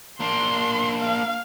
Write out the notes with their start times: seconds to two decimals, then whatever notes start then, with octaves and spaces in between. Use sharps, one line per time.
0.20 A#3 D4 C6
1.00 F5